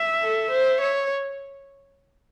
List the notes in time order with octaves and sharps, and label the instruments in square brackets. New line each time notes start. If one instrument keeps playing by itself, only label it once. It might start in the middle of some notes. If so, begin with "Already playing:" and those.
Already playing: [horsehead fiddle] E5
[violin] A4
C5
C#5